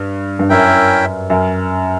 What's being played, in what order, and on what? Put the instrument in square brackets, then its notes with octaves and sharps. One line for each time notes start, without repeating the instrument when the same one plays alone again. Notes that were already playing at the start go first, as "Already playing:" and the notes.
Already playing: [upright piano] G2
G2
[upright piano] F#2 [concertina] C#4 E4 A#4 E5 G5
[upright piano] F#2